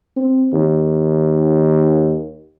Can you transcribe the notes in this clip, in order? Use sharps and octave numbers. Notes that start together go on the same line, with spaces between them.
C4
D#2